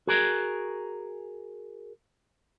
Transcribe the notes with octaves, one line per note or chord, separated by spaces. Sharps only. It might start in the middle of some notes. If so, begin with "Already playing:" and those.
F#4 G#4 A#4